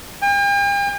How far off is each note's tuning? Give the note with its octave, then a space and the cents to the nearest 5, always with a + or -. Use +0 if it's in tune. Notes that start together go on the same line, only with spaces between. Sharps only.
G5 +45